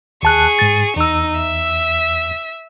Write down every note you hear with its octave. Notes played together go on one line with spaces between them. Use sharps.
D#2 G#4 A5 C#6 F#6
G#2 A6
E2 D#4 E6
E5